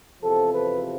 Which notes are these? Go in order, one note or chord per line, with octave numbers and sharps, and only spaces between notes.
E2 C3 F3 A4
B4